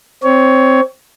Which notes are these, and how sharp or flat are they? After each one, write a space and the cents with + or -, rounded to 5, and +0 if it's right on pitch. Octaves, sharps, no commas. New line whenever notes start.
C4 +0 C#5 +15